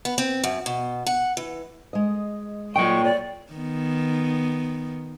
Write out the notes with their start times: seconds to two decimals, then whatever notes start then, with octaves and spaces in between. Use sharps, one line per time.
0.05 B3
0.18 C4
0.44 F#2
0.66 B2
1.06 F#5
1.37 E3
1.93 G#3 D#5
2.76 A#2 F#3 D#5 G5 C#6
3.04 C#5 D5
3.53 D#3 B3